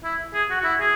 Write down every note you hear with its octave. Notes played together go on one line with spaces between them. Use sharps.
E4
G#4
F#4
F#4
E4
G#4